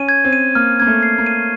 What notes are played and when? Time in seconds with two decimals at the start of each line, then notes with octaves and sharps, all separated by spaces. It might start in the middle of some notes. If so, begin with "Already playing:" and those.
Already playing: C#4 D#7
0.09 G#6
0.25 C4
0.33 D#7
0.55 A#3 F6
0.80 A#3 G#6
0.87 A3
1.03 C7
1.18 A#3
1.26 D#7